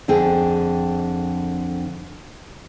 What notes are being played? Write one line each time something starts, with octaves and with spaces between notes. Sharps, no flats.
F2 D3 G#4 G5